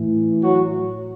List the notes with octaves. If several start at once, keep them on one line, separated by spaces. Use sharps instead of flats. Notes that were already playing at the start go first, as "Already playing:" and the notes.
Already playing: A2 E3
F#3 F#4